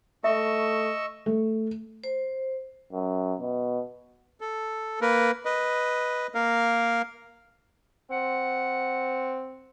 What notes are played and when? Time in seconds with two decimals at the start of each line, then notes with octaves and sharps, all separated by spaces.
0.24 A3 D#5 E5 C#6 E6
1.26 A3
2.04 C5
2.92 F#2
3.40 B2
4.41 A4
5.01 A#3 A#4 B4
5.45 B4 D#5
6.35 A#3 A#4 F5
8.11 C4 F#5